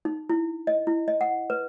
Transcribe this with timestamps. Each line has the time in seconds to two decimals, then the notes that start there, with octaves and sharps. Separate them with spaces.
0.05 D#4
0.30 E4
0.67 D#5
0.87 E4
1.08 D#5
1.21 F#5
1.50 B4